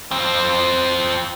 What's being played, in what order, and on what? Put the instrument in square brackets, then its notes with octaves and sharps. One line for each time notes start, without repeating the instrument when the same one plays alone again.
[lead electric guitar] F2 C4